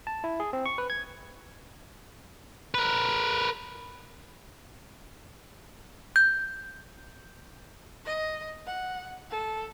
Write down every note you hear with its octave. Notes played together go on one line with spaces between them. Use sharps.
A5
E4
G#4
C4
C#6
B4
G#6
A#4 B4
G6
D#5
F#5
A4